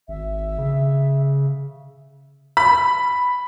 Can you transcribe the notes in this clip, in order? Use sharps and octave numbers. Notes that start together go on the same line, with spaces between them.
G#1 E5
C#3
B5